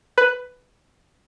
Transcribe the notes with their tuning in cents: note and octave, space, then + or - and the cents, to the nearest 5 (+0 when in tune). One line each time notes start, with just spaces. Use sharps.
B4 +10